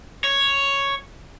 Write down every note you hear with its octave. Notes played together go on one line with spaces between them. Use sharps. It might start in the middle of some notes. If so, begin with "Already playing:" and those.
C#5